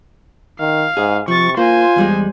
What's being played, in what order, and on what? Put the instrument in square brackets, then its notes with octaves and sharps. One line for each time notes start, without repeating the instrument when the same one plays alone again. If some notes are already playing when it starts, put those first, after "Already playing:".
[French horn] D#3 [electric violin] F5
[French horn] G#2 [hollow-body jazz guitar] G#4
[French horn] C3 [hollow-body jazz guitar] F3 [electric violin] C#6 A6
[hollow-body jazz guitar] A#3 [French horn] F4 [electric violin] C5 G#5
[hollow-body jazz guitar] E2 G3 G#3